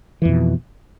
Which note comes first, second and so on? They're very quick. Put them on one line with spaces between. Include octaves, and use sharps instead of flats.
E3 F2 B2